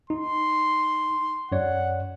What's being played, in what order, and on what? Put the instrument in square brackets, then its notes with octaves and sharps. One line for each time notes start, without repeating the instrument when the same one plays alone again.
[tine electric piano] D#4 [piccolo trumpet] C6
[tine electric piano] F#2 C#5 D5 [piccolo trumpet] F#5